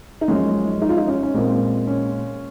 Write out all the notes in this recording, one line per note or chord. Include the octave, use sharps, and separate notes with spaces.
D#4
F#2 F3 G#3 C#4
D#4
F4
D#4
C#4
C#4
A#2 G#3 C4
C#4